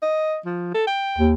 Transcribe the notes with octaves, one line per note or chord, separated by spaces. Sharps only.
D#5
F3
A4
G5
D#2